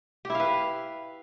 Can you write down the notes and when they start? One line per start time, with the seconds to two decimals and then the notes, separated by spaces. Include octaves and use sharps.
0.25 G4
0.30 E4
0.35 F5
0.40 B4